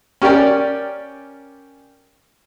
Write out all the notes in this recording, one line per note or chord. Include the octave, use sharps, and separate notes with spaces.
C#4 G4 A#4 D5 G5